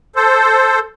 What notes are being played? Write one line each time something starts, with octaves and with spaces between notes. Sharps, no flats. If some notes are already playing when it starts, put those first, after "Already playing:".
A4 C5